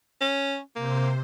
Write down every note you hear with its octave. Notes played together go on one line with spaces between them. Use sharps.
C#4
C3 A#3 C5